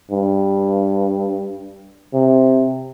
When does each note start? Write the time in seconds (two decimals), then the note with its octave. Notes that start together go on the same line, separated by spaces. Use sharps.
0.11 G2
2.14 C3